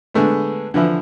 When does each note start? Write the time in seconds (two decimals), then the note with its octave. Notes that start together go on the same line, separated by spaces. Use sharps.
0.14 D3 G#3 A3 B3
0.74 D3 E3 F3 E4